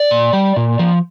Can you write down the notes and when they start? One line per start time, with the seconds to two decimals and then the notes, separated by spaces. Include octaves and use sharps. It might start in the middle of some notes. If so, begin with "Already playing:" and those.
Already playing: D5
0.11 A#2
0.33 G3
0.56 A#2
0.79 F3